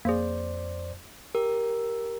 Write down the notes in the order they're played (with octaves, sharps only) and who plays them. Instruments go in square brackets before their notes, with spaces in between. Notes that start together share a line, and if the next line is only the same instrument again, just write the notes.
[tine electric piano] F2 C5 D5 [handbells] A#3 G#4
[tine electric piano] G4 [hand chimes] A#4